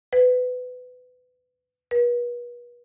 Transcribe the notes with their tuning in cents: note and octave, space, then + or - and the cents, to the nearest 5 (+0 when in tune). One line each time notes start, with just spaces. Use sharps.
B4 +20
B4 -40